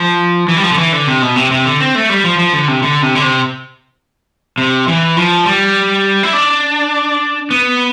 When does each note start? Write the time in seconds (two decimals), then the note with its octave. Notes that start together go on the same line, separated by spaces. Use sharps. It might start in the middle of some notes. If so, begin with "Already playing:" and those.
Already playing: F3
0.48 E3
0.57 G3
0.63 F3
0.72 D3
0.78 E3
0.93 D3
1.07 C3
1.22 B2
1.36 C3
1.51 C3
1.65 D3
1.80 C4
1.95 A3
2.09 G3
2.24 F3
2.38 F3
2.53 D3
2.68 C3
2.83 D3
3.02 C3
3.15 D3
3.22 C3
4.58 C3
4.88 E3
5.17 F3
5.45 G3
6.23 E4
6.33 D4
7.51 B3